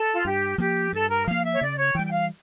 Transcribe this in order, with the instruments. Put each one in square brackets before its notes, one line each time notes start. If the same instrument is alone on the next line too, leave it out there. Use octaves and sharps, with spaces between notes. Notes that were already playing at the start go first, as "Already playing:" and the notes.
Already playing: [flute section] A4
F4
[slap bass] G2 [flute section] G4
[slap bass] F3 A#3 [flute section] G4
[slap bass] G2 [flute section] A4
[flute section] A#4
[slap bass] F3 A#3 [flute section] F5
[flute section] E5
C#5
[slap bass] C#3 [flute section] D5
[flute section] C#5
[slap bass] E3 G3 [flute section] G5
[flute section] G5
F5